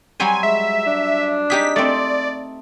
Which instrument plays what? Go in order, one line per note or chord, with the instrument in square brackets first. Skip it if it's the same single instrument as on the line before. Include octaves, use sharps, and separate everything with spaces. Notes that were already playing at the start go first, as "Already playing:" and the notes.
[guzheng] F#3 G3 C5 [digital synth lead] G#5
[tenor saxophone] G#3 [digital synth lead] E5
[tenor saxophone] D4
[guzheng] D#4 G4 G#4 [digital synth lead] B6
[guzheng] A3 C4 [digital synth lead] D5